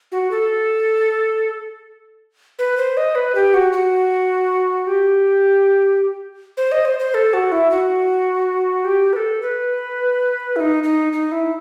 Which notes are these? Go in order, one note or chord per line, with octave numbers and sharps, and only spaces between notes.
F#4
A4
B4
C5
D#5
B4
G4
F#4
F#4
G4
C5
D#5
C5
C5
A4
F#4
E4
F#4
G4
B4
A4
B4
E4
D#4
D#4
D#4
E4